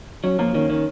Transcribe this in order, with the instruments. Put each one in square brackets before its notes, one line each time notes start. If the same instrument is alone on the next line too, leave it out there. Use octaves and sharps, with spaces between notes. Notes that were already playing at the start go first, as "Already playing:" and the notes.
[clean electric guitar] F#3 [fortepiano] C#4
[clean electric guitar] F3 [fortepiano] A#3
[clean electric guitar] D#3 [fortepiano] C#4
[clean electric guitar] D#3 [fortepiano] C#4